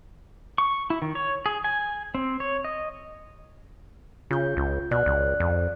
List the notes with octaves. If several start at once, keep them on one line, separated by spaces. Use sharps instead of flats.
C#6
E4
D#3
C#5
G#4
G#5
C4
C#5
D#5
C#3 F4 G6
C#2
B2 D5 F6 F#6
C#2
F2